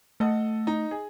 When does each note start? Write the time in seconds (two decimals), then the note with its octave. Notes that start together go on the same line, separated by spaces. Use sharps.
0.20 A3 A4 D#5 F#5
0.67 D#4
0.91 G#4